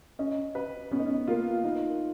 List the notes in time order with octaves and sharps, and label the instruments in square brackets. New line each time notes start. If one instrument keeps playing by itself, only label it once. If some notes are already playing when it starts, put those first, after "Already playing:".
[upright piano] C#4 [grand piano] D#5
[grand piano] B4
[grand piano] B3 [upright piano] C#4
[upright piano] D#4
C#4
[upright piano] A#3 [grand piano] F4
[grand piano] D#4